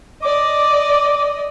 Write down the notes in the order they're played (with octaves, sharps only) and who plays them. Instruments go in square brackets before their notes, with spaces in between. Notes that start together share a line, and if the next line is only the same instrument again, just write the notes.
[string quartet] D5 D#5 [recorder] D6